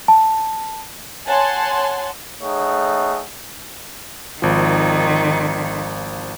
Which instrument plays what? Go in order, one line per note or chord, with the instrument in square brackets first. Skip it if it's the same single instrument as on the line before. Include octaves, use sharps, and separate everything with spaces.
[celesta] A5
[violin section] C#5 F#5 G#5 A5 C6
[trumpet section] A3 D#4 G#4 C#5 F#5
[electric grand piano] G#1 F3 [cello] D#3